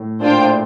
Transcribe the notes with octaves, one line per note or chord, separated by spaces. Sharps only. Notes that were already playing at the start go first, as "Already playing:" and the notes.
Already playing: A2
A#2 D4 F4 C5 G5
A2